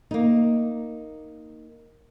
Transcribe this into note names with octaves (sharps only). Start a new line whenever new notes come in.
A#3 D#4